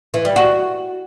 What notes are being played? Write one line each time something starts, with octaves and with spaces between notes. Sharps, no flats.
E3
G3
F#4